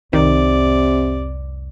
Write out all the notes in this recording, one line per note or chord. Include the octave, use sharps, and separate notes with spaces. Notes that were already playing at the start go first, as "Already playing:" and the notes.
C2 F2 C3 D#3 D5